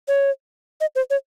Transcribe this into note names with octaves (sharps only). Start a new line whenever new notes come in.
C#5
D#5
C5
C#5